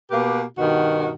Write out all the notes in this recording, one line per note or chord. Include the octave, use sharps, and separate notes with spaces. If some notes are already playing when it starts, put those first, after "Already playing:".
B2 A#3 G4 B4
G2 B2 D#3 F#4